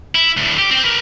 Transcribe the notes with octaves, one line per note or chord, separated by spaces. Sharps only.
E4
D2 A2
G4
C4 G5
A#4 B4